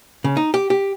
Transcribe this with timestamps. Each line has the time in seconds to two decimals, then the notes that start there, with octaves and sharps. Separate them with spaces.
0.24 C#3
0.37 D#4
0.54 G4
0.70 G4